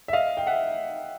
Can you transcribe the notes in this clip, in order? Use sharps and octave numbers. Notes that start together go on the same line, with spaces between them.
E5
D#5 F5
G5
E5 F#5